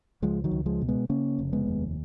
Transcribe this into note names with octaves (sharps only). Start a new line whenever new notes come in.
C#2 F3 G#3
D#3 F#3
C#2
F3 G#3
B2
G#3 B3
C#3 A#3 C#4
F1
G#3 B3
D#2